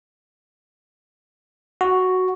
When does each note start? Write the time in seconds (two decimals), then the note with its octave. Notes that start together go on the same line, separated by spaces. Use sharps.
1.81 F#4